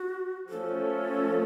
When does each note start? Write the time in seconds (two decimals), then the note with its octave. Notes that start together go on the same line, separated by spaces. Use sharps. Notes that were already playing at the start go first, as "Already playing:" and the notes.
Already playing: F#4
0.49 F3 A3 C#4 A4